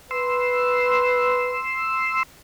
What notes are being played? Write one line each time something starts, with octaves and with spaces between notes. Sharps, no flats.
B4 C6 E6